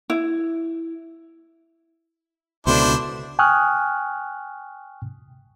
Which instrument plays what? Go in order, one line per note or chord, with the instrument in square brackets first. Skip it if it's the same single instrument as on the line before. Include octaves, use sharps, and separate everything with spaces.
[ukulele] E4
[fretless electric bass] C#2 B2 D3 [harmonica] D4 E4 C5
[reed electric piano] G5 G#5 C#6 D#6 F6 F#6